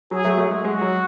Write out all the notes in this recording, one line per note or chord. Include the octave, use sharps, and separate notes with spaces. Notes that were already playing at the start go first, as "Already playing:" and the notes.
F#3 G#4
F#3 A3
F#3 A3
G#3
G#3 F#4
F#3